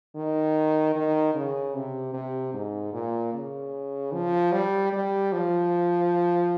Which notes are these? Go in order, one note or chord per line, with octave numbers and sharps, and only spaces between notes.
D#3
D#3
C#3
C3
C3
G#2
A#2
C#3
F3
G3
G3
F3